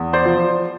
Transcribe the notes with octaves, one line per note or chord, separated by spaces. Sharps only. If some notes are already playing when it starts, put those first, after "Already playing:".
Already playing: E2
C5 D5
F3